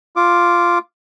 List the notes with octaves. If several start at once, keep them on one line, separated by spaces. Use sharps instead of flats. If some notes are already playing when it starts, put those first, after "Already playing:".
F4 D6